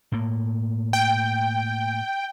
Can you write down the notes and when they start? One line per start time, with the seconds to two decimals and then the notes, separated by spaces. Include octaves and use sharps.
0.12 A2 A#3
0.93 G5